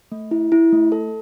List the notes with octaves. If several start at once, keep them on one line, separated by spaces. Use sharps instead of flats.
A3
E4
E4
A3
A4